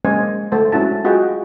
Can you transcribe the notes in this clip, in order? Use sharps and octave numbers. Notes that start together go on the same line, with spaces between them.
G#3 A#3 C#4 C5 D#5 G#5
A3 C5 A5
G#3 C#4 E4 F#4 A5
F4 F#4 G#4 D#5 F#5 G5